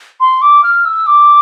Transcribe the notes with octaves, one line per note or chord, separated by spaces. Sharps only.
C6
D6
F6
E6
D6